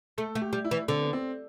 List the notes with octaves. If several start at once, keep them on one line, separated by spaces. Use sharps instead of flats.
A3 A4
A3
G4
G3
E4
E3
D3 C4
B3
C4